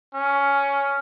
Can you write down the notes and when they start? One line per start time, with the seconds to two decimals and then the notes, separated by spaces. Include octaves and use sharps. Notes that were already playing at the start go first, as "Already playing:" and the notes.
0.14 C#4